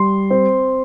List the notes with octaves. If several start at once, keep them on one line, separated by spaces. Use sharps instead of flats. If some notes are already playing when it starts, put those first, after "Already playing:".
Already playing: G3 C6
C4